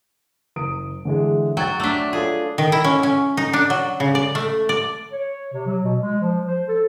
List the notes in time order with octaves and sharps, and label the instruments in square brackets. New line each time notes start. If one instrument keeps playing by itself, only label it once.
[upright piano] F#1 D#6 D7
D3 E3 G#3
[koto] F#3 [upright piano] G5 G#6 A6
[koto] A3 D4 [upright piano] D6 B6
[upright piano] F4 A4 C#5 [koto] G#4
[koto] D#3
E4
C#4
C#4
D#4
D4
F#3
C#3
D5
A3
D5
[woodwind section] C#5
C3
F#3
B2
G#3
F3
C5
A4